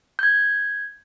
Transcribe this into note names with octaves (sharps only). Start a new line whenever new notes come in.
G6 G#6